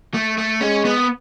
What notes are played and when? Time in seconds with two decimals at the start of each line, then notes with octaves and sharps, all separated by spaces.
0.14 A3
0.38 A3
0.61 G#3 C#4
0.85 B3